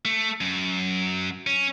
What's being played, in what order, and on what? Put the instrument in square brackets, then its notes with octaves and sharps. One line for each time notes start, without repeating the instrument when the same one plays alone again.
[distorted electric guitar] A3
F#2
C#4